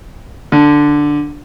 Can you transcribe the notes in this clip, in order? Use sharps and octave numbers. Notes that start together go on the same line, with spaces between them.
D3